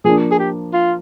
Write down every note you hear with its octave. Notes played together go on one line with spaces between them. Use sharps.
F3 A#3 D4 G#4
G#4
G4
F4